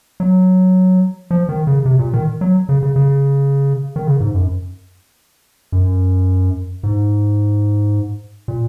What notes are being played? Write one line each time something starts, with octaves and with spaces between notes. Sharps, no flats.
F#3
F3
D#3
C#3
C3
A#2
D#3
F#3
C#3
C#3
C#3
D#3
C#3
G#2
F#2
F#2
G#2
A#2